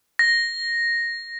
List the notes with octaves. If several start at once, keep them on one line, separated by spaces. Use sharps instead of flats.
A#6